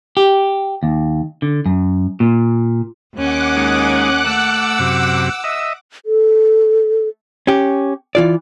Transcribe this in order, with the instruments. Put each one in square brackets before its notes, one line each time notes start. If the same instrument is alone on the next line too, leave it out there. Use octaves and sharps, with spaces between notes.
[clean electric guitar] G4
D#2
D3
F#2
A#2
[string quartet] D#2 C#4 [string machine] F#5 D6 F#6
[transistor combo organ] G#3 D#4
[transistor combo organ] A3 [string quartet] E6
[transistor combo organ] F#2 C3
D#5 E5
[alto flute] A4
[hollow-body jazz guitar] C#4 G4
E3 F4 D5